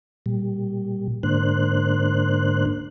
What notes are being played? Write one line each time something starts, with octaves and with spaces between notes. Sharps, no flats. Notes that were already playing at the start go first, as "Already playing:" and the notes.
A#2 G3
G#2 D3 A#3 D4 C5 F#6